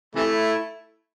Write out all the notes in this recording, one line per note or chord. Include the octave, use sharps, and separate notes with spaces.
C3 E3 A3 E4